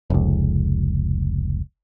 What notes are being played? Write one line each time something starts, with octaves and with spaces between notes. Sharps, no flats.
F1 C#2